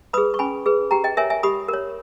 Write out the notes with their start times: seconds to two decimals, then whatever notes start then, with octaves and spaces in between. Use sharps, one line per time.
0.13 G#4 B4 B5 D#6
0.34 C#6
0.39 C#4 G#5 B5
0.66 G#4 B4
0.91 G4 G5 A#5
1.04 D#5 G5
1.17 A#4 C#5 E5 G#5
1.30 E5 G#5
1.43 G4 B5 D#6
1.69 A#4 C#5